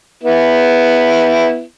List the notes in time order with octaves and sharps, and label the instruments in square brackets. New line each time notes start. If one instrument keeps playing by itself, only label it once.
[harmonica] B3 E4